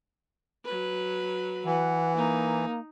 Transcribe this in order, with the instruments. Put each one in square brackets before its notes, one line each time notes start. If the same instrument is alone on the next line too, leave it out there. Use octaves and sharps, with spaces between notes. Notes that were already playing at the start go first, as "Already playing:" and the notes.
[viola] F#3 B4
[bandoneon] E3 [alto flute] F#5
[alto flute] A#3 [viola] D#4